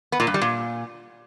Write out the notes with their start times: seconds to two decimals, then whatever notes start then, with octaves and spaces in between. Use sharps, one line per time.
0.12 B3
0.20 A#2
0.27 G2
0.34 G3
0.41 A#2